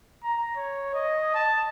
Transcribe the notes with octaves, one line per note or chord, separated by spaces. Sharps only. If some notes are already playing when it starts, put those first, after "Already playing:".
A#5
C#5
D#5
A5